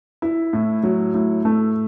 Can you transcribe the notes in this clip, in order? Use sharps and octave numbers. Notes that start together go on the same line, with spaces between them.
E4
A2
F#3
A2
A3